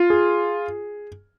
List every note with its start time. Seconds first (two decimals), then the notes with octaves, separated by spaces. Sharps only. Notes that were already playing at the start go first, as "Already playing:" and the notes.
Already playing: F4
0.10 G#4